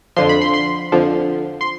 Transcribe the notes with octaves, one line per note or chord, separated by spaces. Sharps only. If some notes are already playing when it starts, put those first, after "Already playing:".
F2 D3 F3 C6
B5
C6
C6
F2 D3 F3
C6